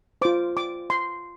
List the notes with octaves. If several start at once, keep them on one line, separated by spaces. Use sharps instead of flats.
F4 C5 D6
D6
C6